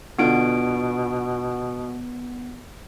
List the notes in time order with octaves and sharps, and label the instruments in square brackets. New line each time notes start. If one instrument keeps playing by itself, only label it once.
[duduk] B2 [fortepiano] D3 F4 [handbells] B3 D7